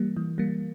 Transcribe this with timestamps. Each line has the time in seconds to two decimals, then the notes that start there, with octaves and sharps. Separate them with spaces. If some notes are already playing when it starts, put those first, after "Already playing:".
Already playing: E3 G3 A#3
0.17 E3
0.38 G3 A#3